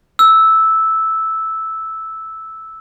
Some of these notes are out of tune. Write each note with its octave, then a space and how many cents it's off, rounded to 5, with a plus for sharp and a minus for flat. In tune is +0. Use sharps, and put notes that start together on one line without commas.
E6 -10